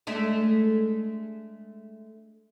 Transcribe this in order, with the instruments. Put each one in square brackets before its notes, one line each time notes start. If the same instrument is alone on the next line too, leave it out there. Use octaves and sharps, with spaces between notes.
[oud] G#3 A3 D4